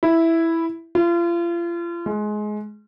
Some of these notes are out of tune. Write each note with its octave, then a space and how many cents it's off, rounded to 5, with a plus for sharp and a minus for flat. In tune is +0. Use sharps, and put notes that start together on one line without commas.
E4 +0
F4 -35
G#3 +20